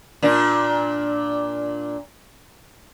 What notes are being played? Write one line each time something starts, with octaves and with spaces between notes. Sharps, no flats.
A#2 D4